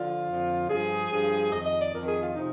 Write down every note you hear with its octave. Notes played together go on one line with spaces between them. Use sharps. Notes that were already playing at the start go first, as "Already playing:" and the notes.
Already playing: D3 F3 F4
F2 D3 F3
G2 F3 G#4
G2 F3
F2 D#3 D#5
D#5
D5
F2 D#3 A#4
G#4
F4
C3 F3 D#4